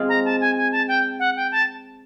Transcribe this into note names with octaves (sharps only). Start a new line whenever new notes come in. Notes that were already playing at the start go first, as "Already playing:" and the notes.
Already playing: G#3 C4 F4 G#4
A#5
A5
G#5
G#5
A5
G5
F#5
G5
A5